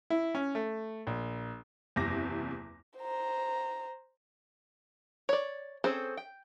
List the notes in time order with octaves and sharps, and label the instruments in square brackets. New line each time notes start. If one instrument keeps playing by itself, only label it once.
[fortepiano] E4
C#4
A3
A#1
[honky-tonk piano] F#1 E2 C3 D6 A#6
[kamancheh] C5 A#5
[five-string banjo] C#5 D5
C4 C#4 G#4 A4 C5
G5